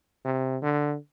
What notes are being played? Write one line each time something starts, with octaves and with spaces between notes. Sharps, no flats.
C3
D3